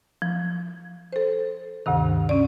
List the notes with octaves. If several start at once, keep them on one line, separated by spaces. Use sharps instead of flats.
F3
A4 C5
D2 G2 C3 D#3
C#4 D5